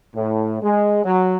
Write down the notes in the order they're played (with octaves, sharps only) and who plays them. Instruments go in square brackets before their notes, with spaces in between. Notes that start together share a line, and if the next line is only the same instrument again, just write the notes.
[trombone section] A2
G#3
F#3